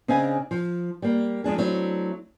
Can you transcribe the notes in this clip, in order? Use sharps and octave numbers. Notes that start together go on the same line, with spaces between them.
C#3 C4 D4 D#5 F5 G#5
F3
G3 A#3
F2 G#3 D4 G#4
F#3 A3 C4 D4 E4